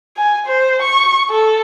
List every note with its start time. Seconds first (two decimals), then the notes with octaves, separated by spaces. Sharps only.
0.17 G#5
0.46 C5
0.82 C#6
1.30 A4